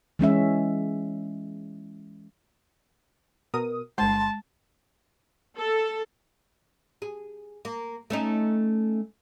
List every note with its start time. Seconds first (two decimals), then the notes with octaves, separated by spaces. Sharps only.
0.19 E3 G#3 C#4 E5
3.54 B2 A#4 D#6
3.98 G1 G#3 A5 C6
5.57 A4
7.02 G#4
7.65 A#3
8.10 A3 C#4 D#4